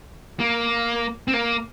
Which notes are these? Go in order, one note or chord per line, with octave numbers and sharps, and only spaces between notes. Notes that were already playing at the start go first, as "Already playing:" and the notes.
A#3
C4
A#3